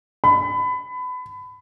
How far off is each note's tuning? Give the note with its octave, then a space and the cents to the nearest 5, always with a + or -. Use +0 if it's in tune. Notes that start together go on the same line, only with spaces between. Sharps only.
B5 +25